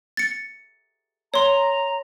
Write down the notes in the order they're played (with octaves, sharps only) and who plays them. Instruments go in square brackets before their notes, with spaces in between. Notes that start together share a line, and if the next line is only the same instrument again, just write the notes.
[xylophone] A6 C#7
[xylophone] C#5 C6 [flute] A#5